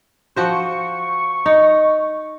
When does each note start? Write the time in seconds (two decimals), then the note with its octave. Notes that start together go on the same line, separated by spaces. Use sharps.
0.36 F3 F#4 C5 C#6
1.46 D#4